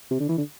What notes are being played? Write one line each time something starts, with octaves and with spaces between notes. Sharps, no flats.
C3
D3
E3
D3